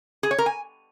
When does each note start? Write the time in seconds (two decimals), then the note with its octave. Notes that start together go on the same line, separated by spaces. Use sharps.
0.23 G#4
0.31 C#5
0.38 A#4
0.46 G#5